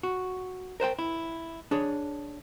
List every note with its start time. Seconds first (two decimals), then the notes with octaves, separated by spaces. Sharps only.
0.03 F#4
0.80 A#4 C5 F#5 G5
0.99 E4
1.71 D4 G#4 C#5